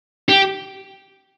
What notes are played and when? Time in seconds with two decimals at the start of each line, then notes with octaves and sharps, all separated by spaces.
0.29 G4